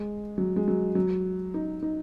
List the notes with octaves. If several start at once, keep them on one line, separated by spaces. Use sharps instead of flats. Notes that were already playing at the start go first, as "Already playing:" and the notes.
Already playing: G#3
F#3
G#3
F#3
F#3
D#4
D#4